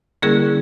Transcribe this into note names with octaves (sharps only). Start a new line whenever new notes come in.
D3 G3 A#3 C#4 E4 G#4 A#4